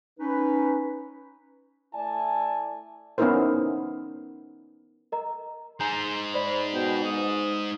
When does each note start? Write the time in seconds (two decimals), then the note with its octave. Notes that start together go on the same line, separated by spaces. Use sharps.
0.19 C#4 D#4 B4
1.94 A3 E4 D5 G#5 A5
3.18 B3 C#4 D#4 E4 A#4 C5
5.12 A#4 D#5 A#5
5.80 G#3 D#4 G#5 A#5 C6 G6
6.34 C5 D5 B5
6.73 B2 G5
7.05 G#2 D#6